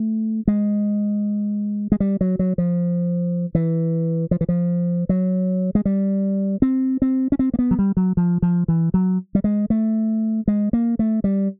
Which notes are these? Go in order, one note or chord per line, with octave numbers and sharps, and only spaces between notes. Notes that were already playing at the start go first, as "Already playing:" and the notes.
Already playing: A3
G#3
G#3
G3
F#3
F#3
F3
E3
F3
E3
F3
F#3
G#3
G3
C4
C4
C#4
C4
A#3
B3
F#3
G3
F#3
F3
F3
E3
F#3
G3
G#3
A3
G#3
A#3
A3
G3